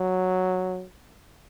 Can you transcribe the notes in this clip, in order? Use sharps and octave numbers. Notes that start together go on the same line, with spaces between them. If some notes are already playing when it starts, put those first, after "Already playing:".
Already playing: F#3